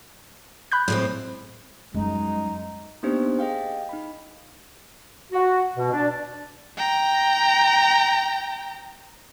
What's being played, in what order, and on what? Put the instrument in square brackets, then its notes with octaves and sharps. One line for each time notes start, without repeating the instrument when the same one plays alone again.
[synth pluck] B5 F#6 G6
[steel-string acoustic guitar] A2 G#3 C4
[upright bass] F#2 G3 [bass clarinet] G#3 [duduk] D#4
[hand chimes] A#3 B3 D4 D#4 G4 C5
G#4 D#5 F5 G5
D#4 B5
[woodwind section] F#4
B2
D4
[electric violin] G5 A#5